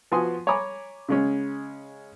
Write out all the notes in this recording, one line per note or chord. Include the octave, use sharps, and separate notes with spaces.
F3 B3 F#4 G#5 C6 D#6
C#5 G#5 A#5 B5 D6
C#3 G#3 C#4